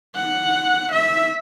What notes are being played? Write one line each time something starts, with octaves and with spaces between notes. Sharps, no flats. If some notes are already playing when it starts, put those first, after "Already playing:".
F#5
E5